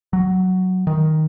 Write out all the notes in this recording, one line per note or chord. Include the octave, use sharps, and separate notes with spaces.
F#3
D#3